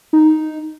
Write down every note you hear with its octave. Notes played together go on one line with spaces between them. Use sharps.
D#4